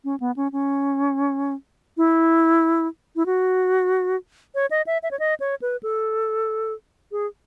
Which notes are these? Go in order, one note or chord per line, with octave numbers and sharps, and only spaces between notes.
C#4
B3
C#4
C#4
E4
E4
F#4
C#5
D#5
E5
E5
C#5
D#5
C#5
B4
A4
G#4